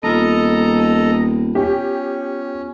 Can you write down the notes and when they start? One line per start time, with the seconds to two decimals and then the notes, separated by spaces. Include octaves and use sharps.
0.03 D#1 B3 F4 A4 D#5 A#5
1.55 C#4 G4